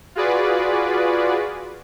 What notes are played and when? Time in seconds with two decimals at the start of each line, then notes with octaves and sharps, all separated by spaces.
0.15 F4 F#4 G#4 B4 D5